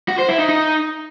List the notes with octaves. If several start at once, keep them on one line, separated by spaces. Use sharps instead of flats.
F#4
C5
E4
D#4
D#4